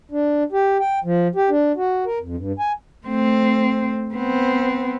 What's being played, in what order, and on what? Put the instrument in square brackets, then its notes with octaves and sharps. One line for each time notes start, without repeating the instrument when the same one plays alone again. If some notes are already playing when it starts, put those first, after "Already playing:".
[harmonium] D4
G4
G5
F3
G4
D4
F#4
A#4
F2
G2
G#5
[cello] A3 C4
B3 C4